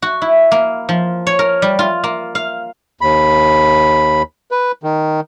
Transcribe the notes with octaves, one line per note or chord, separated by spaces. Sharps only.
F#4
E4
A#3
F3
C#5
A#4
G3
F4
A#3
F5
D#2 B5
B4
D#3